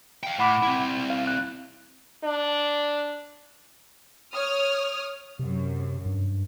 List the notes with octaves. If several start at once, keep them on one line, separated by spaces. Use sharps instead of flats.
F5 G5
A2 F#5 B5 D6
C4 E4
F5
F#6
D4
C#5 D#6 F6
F#2 C3
G2